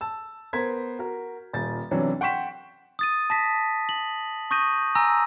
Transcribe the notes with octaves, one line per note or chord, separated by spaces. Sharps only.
A5 E6
B3 A#4 C5 C6 G#6 B6
F#4 A#4
D#1 A6
C3 E3 F#3 C#4 D4
F#5 G5 C6 C#6 B6 E7
D#6 A6 D#7
A5 A#6 B6
F#7
C#6 D#6 G6 A#6 D#7
G#5 A#5 E6 A#6